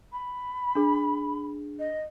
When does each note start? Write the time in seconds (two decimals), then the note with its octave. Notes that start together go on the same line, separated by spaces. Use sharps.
0.13 B5
0.75 D4 G#4
1.79 D#5